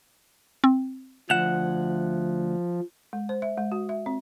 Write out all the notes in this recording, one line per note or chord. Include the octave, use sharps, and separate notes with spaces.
C4
D2 F3 F#5 E7
G#3
C5
E5
G#3
F#4
E5
C4